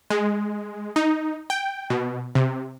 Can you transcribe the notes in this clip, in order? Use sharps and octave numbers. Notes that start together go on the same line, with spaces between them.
G#3
D#4
G5
B2
C3